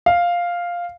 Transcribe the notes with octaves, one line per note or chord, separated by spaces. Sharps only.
F5